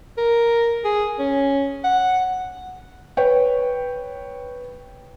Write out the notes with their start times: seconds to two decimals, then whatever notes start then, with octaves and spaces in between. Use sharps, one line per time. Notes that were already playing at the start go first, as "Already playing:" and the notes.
0.18 A#4
0.85 G#4
1.19 C#4
1.84 F#5
3.17 B4 C#5 G5